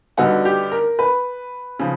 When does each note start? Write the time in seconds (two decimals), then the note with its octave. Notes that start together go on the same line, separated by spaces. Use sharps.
0.17 G2 D3 G3 B3 D#4 F#4
0.45 G4
0.72 A#4
0.99 B4
1.79 C#3 F3